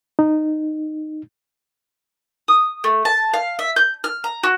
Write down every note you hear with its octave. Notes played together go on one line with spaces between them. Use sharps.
D#4
D#6
A3
A5
F5
E5
G6
F6
A#5
F#4